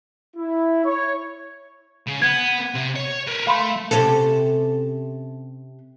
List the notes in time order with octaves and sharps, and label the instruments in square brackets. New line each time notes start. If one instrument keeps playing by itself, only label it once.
[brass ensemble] E4
C#5
[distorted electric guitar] C#3
[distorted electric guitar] B3 [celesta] G#6
[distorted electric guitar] C3
C#5
A#4 B4
[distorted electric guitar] A3 [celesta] F5 B5 C6
[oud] C3 C#4 A4